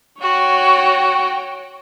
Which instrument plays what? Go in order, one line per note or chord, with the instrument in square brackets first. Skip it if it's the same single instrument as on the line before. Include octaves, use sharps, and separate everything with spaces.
[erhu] F#4 [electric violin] C#5 G5